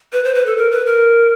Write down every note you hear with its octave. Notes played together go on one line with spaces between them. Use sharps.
B4
C5
B4
A4
A#4
B4
A#4